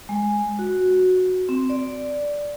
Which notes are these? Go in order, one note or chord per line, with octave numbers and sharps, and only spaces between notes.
G#3
F#4
C4
D5